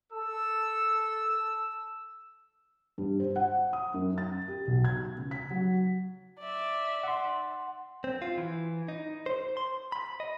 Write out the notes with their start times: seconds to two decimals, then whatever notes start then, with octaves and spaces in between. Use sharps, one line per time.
0.12 A4 E6
2.98 G2
3.20 C5
3.36 F#5
3.73 D#6
3.94 F#2
4.18 A6
4.48 G4
4.67 B1
4.84 G#6
5.17 C#2
5.31 B6
5.51 F#3
6.39 D5 E5
7.03 F#5 C6
8.04 C4
8.22 F4
8.38 E3
8.88 D#4
9.26 C5
9.57 C6
9.92 B5
10.20 D#5